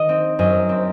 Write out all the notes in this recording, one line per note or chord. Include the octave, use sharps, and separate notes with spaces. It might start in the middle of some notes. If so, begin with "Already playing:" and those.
Already playing: D#3 D#5
C4
F#2 D#5
C4